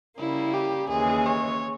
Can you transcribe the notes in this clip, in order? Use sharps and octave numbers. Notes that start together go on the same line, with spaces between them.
C#3 G3 A#3 E4
G4
D#2 C#3 E3 G#3 G#4
C#5